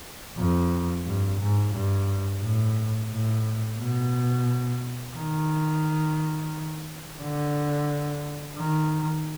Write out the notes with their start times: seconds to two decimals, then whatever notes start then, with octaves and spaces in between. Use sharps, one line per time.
0.38 F2
1.06 G2
1.41 G#2
1.74 G2
2.43 A2
3.11 A2
3.79 B2
5.16 D#3
7.21 D3
8.57 D#3